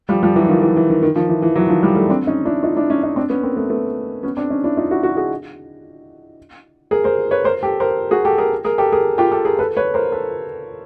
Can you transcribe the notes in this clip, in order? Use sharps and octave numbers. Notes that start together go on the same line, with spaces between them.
F3 G3
F3 G3
E3 F#3
D#3 F3
E3
E3
D#3
D#3
D#3 F3
E3
E3
E3 F#3
D#3 F3
F3 G3
G3 A3
C4 D4
C#4 D#4
D4 E4
D#4 F4
D4 E4
C#4 D#4
C#4 D#4
C4 D4
B3 C#4
A#3 C4
A3 B3
A3 B3
B3 C#4
C4 D4
C#4 D#4
D4 E4
D#4 F4
E4 F#4
E4 F#4
F#4 G#4
G#4 A#4
A#4 C5
B4 C#5
A#4 C5
G4 A4
A#4 C5
F#4 G#4
G4 A4
G#4 A#4
G#4 A#4
G4 A4
G#4 A#4
F4 G4
G4 A4
G#4 A#4
A4 B4
B4 C#5
A#4 C5
A4 B4